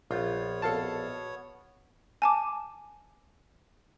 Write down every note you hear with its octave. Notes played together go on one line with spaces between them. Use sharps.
A#1 B3 F4 C#5
B2 A4 F5 A5
G#5 A5 D6